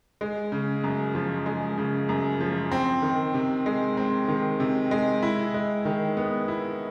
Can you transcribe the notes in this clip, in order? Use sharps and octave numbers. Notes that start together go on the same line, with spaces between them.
G#3
C#3
F#2
F3
G#3
C#3
F#2
F3
C4
D#3
C3
G#3
C4
D#3
C3
G#3
E4
G#3
D#3
B3
E4